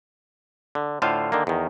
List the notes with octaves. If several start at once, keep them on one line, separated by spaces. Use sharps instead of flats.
D3
A2 D3 F4 C5 F5
D3 D#3 A#3
E2 D#3